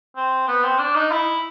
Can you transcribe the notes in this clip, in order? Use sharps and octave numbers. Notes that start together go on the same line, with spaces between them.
C4
B3
C4
D4
D#4
E4